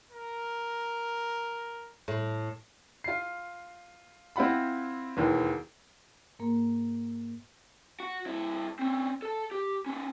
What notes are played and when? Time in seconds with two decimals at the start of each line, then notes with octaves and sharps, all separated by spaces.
0.12 A#4
2.08 A2
3.04 F4 C7
4.36 C4 E4 F4 F#5 B5
5.17 E1 D#2 E3
6.39 G#2 A#3 A#4
8.00 F#4
8.26 G2 E4
8.79 C4 C#4
9.22 A4 A5
9.51 G4
9.86 B3 C#4